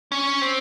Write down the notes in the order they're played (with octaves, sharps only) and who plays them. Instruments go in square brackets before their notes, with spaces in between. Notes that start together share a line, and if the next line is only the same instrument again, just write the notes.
[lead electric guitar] C#4
C4